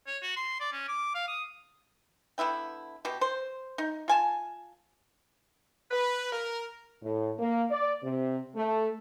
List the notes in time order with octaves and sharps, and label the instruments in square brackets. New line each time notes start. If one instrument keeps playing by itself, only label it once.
[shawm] C#5
F#4
C6
D5
C#4
D6
F5
D#6
[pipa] D3 B3 E4 G5
B2 G4
C5
D#4
F4 G#5 A5
[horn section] B4
A#4
[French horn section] A2
A#3
D5
C3
A3